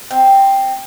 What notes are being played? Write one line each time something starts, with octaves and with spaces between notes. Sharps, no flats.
C4